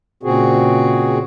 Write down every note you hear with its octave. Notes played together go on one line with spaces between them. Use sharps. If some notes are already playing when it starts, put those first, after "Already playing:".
A#2 C#3 C4 F#4 G#4